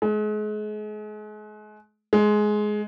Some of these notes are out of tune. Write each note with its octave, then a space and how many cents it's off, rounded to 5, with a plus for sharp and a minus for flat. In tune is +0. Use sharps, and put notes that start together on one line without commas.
G#3 +35
G#3 +15